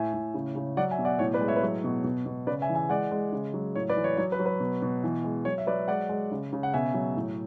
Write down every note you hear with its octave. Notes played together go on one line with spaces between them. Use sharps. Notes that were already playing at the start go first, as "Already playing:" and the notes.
Already playing: A2 E5 G#5
A2
C#3
C#3
F#3 D5 F#5
E5 G#5
B2
D5 F#5
A2 C#5
B4 D5
G#3
C#5 E5
B4
F#3 C#5
B2
B2
B2
C#3 B4 D5
E5 G#5
E3
E5 G#5
G#3 D5 F#5
G#3
C#3
F#3
A2 C#5
B4 D5
E3
C#5
F#3 C#5
B4
F#3
B4
B2
B2
E3
G#3
F#3 C#5
E5
F#3 B4 D5
G#3 D5 F#5
G#3
C#3
C#3
F#5
B2 E5 G#5
F#3
A2